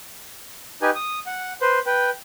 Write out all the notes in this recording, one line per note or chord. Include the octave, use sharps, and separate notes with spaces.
D#4 G4 B4 G#5
D#6
F#5
B4 C5
B4 G5